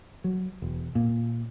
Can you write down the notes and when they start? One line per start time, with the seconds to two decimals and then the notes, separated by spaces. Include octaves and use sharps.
0.24 F#3
0.62 E1
0.95 A#2